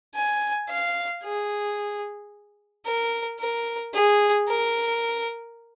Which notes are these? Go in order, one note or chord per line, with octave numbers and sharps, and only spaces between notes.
G#5
F5
G#4
A#4
A#4
G#4
A#4